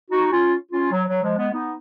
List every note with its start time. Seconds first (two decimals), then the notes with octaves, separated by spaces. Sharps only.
0.11 D#4 F#4
0.32 C#4 F4
0.72 C#4 F4
0.91 F#3
1.07 F#3
1.22 F3 G#3
1.37 G#3 B3
1.52 B3 D#4